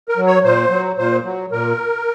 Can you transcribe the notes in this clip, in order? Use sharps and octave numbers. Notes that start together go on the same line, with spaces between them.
A#4
F#3
C#5
A#2 C5
F#3
A#2 C5
F#3
A#2 A#4